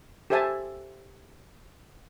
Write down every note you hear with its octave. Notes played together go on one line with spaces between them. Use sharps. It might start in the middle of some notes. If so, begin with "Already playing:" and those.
G4 A4 C5 E5 G#5 A5